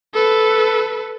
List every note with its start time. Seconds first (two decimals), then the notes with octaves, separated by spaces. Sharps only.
0.14 A4 B4